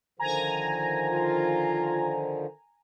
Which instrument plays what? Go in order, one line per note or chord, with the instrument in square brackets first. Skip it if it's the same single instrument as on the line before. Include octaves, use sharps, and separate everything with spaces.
[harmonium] D3 D#3 F3 [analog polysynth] G#5 A#5
[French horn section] F4